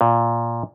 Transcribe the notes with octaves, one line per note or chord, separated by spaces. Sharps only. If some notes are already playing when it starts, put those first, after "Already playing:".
A#2